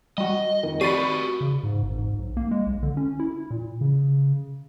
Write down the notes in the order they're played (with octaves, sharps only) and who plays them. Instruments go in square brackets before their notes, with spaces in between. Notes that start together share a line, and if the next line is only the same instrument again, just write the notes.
[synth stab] G3 F#4 [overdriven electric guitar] D#5
[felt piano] F2 D#3
[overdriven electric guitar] C4 F#4 [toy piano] G4 [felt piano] D5 [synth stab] B5 A6 D#7
[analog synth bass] C#3
G#2
G#1
G#2
B1
A#3
G#3
B1
D3
C#4
E4
A#2
[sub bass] C#3